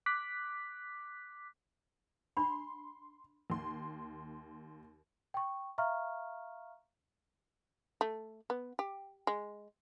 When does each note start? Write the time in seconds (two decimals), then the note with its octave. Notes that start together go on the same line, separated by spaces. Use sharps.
0.06 D6 F#6 B6
2.37 D4 B5 C6
3.50 D#2 C6
5.34 G5 C#6
5.78 E5 F5 A#5 C#6 F6
8.01 A3
8.50 B3
8.79 G4
9.27 G#3